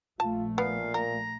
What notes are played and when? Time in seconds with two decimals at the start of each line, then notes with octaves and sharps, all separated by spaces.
0.20 A#1 A3 F4 A5
0.58 A#2 B3 F5
0.94 A#4 A#5